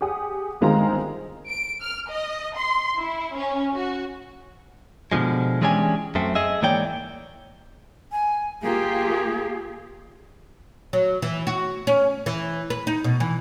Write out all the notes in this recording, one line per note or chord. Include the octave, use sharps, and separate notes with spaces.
G4 G#4 F#5 D#6
G1 D#3 G#3 C4 F4 A#5
D7
F6
D#5
C6
E4
C#4
F#4
B2 D3 F3 G#3
E3 G#3 C#4 D4 G4 G#5
F#2 A3 C4
G#4 D#5 E5
G#2 E3 A#3 C#5 D5 G5
G#5
A#3 F4 G4 G#4
F#3
E3
F#4
C#4
E3
B4
D#4
B2
E3